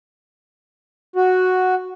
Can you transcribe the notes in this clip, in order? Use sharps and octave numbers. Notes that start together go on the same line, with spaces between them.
F#4